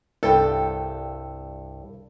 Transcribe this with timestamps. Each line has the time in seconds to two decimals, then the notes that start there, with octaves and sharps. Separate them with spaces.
0.23 C2 G2 A4 G5